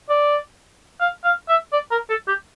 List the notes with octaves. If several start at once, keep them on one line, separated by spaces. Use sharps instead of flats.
D5
F5
F5
E5
D5
A#4
A4
G4